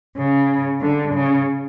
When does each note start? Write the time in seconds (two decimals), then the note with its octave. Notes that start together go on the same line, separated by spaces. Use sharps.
0.16 C#3
0.81 D3
1.14 C#3